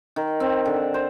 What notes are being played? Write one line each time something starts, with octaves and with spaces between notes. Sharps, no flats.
D#3
C4
D3
C5